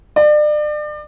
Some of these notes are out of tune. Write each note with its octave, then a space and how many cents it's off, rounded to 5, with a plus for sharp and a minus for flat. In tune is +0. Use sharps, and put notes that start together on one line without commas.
D5 +35